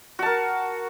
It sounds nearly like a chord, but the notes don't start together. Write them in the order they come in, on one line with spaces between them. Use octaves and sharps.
F#4 A5 A#4